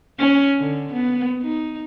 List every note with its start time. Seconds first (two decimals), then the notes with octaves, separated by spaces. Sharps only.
0.19 C#4
0.59 D3
0.93 B3
1.42 D#4